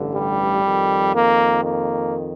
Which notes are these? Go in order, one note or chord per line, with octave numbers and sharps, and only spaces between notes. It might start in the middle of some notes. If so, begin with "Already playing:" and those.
Already playing: A1 G2 D3
G3
F2 D#3
A#3
A#3